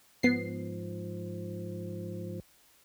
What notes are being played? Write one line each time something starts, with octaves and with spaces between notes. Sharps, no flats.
G#2 F3 B3 C7